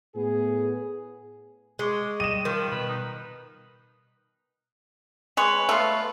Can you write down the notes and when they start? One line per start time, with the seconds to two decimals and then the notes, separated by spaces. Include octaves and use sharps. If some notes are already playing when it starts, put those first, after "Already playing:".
0.15 A2 B3 G#4
1.79 G#3 C#6 D6
2.20 G3 D#5 D#7 E7
2.45 D#3 F3 A#6
2.71 B2 B4
2.89 D#4 F6 F#6
5.37 G#3 B4 C#5
5.69 A3 B3 F4